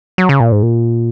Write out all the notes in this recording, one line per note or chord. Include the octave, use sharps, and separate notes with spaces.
F#3
C#3
A#2
G#2
A#2